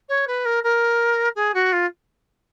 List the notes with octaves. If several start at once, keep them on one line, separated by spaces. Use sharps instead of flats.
C#5
B4
A#4
A#4
G#4
F#4
F4